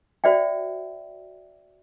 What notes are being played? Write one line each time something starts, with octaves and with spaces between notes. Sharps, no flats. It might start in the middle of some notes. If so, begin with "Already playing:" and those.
F#4 C5 D5 E5 G5